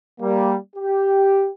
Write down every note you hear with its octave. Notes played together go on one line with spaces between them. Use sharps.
G3 A#3
G4